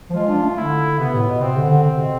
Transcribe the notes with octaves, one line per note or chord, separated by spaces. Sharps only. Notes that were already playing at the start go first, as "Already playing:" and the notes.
F3
G#3 F4
D4
A3
D3 E4
C3 B3
A2
B2
C3 C4
D3
D3
C3
B2